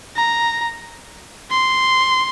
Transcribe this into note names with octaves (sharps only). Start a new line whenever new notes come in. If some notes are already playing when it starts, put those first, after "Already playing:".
A#5
C6